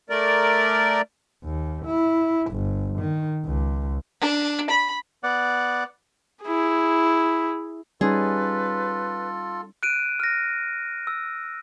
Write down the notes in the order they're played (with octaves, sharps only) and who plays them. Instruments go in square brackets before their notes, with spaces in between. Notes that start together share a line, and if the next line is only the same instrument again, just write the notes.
[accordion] A3 A#4 D5
[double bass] D#2
E4
G1
D#3
C#2
[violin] D4
B5
[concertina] B3 D5 F#5
[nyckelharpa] E4 G#4
[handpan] G3 C#4 D#4 [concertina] F4 A4 [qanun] G#4 [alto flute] B4
[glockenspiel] F#6 D7 D#7
F6 A#6
E6